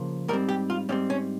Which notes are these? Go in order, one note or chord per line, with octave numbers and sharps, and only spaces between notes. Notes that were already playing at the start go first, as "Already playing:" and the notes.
Already playing: C#3 F3 A#3
G#2 G3 C4 A#4
G4
F4
G#2 G3 C4 C#4
C#4